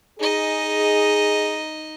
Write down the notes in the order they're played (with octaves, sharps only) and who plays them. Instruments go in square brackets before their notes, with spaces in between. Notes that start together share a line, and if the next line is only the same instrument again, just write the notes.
[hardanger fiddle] D#4 D#5 [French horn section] G#4